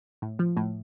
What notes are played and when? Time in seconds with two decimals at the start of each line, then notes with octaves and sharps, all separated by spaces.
0.22 A2
0.39 F3
0.57 A2